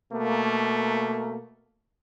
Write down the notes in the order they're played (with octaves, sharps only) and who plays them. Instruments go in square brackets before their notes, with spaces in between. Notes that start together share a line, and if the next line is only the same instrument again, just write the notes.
[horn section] B2 A3 A#3